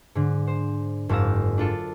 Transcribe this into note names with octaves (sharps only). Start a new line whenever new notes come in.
G#2 D3
C5
F#1 G#2 F5 E6 A#6
D4 F4 A4